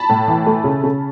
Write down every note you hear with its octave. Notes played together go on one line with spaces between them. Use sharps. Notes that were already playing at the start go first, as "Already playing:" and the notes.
Already playing: A5 B5
A2
E3
A3
C#3
C#3